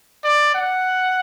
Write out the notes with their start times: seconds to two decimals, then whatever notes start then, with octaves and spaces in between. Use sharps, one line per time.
0.24 D5
0.54 F#5